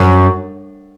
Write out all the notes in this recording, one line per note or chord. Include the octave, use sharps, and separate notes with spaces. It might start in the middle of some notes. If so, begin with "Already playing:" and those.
Already playing: F#2